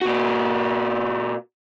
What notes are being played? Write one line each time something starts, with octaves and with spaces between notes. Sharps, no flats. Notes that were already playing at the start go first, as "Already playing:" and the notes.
A#2 F#4